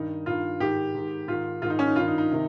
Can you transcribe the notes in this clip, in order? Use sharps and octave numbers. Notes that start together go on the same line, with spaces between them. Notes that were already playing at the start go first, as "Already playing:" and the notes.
Already playing: G2 D#3 D#4
G2 D#3 F4
G#2 D#3 G4
G#2 D#3
G#2 D#3 F4
G#2 D#3 F4
D#4
C#4
D#4
G2 D#3 F4
D#4
D#4
C3 D#3